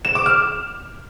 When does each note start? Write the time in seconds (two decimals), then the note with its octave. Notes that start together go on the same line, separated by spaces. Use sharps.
0.05 E7
0.15 D6
0.26 F6